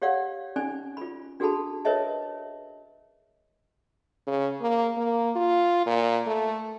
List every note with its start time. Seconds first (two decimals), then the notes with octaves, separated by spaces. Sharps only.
0.02 G4 C#5 D5 F5 F#5
0.56 C#4 D#4 D5 G#5
0.97 F4 B5
1.40 D4 F#4 G#4 A4 A5 B5
1.85 A#4 B4 C#5 D#5 E5 A5
4.27 C#3
4.61 A#3
4.97 A#3
5.36 F4
5.86 A#2
6.27 A3